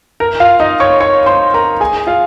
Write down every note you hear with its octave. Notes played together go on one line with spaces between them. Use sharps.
A#4
F4 F5
D#4 D#5
C#5 C#6
C#5 C#6
C5 C6
A#4 A#5
G#4 G#5
F4 F5